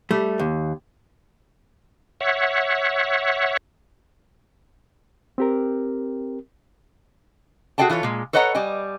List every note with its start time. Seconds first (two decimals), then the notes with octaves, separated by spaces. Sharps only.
0.11 G3 A3
0.39 D#2
2.21 C#5 E5 F#5
5.38 C4 G4 A#4
7.78 F#4 G#4 A4 D5 G5 A5
7.90 E3 F4 A4 C#5
8.03 A#2 G#3
8.33 A4 B4 C#5 D#5 F#5 A#5
8.55 G3 D5 D#5 G#5